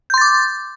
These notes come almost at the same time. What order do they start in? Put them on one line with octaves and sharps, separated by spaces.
G6 C6 A6 D6